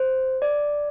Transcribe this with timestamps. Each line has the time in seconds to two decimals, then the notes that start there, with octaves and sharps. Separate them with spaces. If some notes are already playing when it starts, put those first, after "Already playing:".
Already playing: C5
0.42 D5